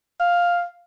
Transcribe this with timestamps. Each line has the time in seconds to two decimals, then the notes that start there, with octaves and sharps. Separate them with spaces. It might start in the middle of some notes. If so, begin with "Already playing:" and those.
0.20 F5